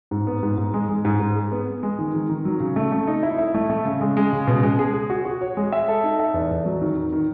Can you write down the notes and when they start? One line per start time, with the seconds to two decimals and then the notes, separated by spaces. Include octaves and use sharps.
0.11 G#2
0.27 B3
0.43 G#2
0.58 G#2
0.74 G#3
0.89 G#3
1.05 G#2
1.20 G#2
1.35 G#4
1.52 B3
1.67 B3
1.83 G#3
1.99 D#3
2.14 D#3
2.29 D#3
2.45 F#3
2.60 C#3
2.76 A3
2.92 A3
3.07 D#4
3.23 E4
3.38 E4
3.54 A3
3.70 A3
3.85 C#3
4.01 G#3
4.17 G#3
4.32 C#3
4.47 B2
4.63 G#3
4.79 G#4
4.94 G#4
5.10 F#4
5.25 F#4
5.41 C#5
5.57 G#3
5.72 E5
5.88 A4
6.03 D#4
6.19 E5
6.34 E2
6.51 E2
6.66 F#3
6.82 D#3
6.97 D#3
7.12 D#3